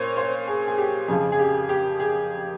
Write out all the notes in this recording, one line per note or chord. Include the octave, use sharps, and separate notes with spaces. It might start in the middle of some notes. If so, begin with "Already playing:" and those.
Already playing: A#2 C5 C#5
C5
G#4
G#4
G4
F2 C#3 F3 G#4
G#4
G4
G4
G#4